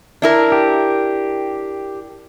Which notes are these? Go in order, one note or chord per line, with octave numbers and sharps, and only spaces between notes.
D4 E4 A#4
G4